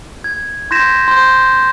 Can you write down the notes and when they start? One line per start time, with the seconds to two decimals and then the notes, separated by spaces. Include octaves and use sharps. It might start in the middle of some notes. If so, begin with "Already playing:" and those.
0.24 G#6
0.71 C6 G6 G#6 A#6 B6 E7
1.08 C6 G6